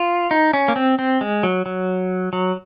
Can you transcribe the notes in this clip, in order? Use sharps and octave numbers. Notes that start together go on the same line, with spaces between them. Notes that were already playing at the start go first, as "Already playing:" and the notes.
Already playing: F4
D#4
C#4
A#3
C4
C4
G#3
F#3
F#3
F#3